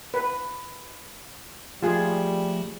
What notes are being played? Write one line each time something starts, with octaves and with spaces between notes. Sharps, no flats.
B4
F3 G3 A3 F4 G#4